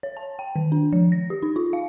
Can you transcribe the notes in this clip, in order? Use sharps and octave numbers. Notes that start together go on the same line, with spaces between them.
C#5
A5
G5
D#3
D4
F3
A#6
G4
D#4
F4
F5